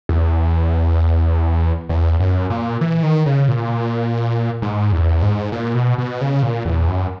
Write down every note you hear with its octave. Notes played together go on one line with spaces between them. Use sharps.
E2
E2
F#2
A#2
E3
D#3
C#3
A#2
G#2
E2
G#2
A#2
B2
B2
C#3
A#2
E2
F#2